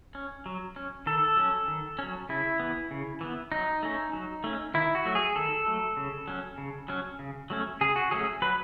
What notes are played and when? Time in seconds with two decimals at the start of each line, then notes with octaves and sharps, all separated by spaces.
0.15 C#4
0.46 F#3
0.76 C#4
1.06 D#3 A4
1.37 F#3 C#4
1.68 D#3
1.99 F#3 C#4
2.29 C#3 E4
2.60 E3 B3
2.91 C#3
3.21 E3 B3
3.52 F#3 D#4
3.83 A3 C#4
4.13 F#3
4.44 A3 C#4
4.74 D#3 E4
4.95 F#4
5.05 F#3 A3
5.15 G#4
5.35 D#3 A4
5.66 F#3 A3
5.97 C#3
6.28 F#3 C#4
6.58 C#3
6.88 F#3 C#4
7.19 C#3
7.50 F#3 A3 C#4
7.81 C#3 G#4
7.96 F#4
8.11 F#3 A3 C#4 G#4
8.42 F#3 B4